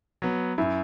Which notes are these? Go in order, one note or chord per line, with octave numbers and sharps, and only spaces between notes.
F#3 B3
F#2 E4